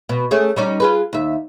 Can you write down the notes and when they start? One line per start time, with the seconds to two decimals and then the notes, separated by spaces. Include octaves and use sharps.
0.09 B2
0.31 A3 C#4 G#4
0.56 G3 C#4 D#4
0.80 F4 G#4 B4
1.13 D#2 E5